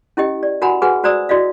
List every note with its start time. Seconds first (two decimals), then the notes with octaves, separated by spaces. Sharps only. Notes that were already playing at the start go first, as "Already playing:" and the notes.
0.17 C#4 E4 G4 D#5 G5
0.43 D5
0.62 F#4 A#4 F#5 G#5 A#5 B5
0.82 F#4 G#4 B4 F#5 G#5
1.04 F#4 C5 D5 A#5 D#6 E6
1.29 E4 F#4 D5 D#5 F5